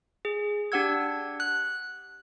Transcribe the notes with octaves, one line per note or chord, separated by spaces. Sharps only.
G#4
D4 G4 F#5 E6 G#6
F#6